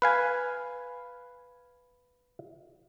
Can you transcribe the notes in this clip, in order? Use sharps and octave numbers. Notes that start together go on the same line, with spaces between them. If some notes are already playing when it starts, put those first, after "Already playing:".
B4 F5 G#5